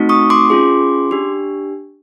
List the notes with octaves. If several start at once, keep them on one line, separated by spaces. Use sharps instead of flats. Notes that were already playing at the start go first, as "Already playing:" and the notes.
Already playing: A3 C4 D#4 F#4
C#6 D#6
C6 D6
C#4 F4 G#4
D4 G4